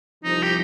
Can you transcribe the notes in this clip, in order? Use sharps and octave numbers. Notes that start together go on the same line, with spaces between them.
C2 C3 F3 D#4
G4